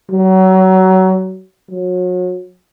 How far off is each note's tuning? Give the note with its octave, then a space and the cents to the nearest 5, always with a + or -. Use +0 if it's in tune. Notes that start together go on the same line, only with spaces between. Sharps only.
F#3 +25
F#3 -35